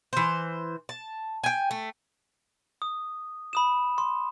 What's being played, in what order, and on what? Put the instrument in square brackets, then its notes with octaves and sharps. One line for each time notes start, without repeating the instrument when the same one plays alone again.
[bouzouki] E3 C5
A5
G5 G#5
A3
[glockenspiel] D#6
B5 D#6 E7
C6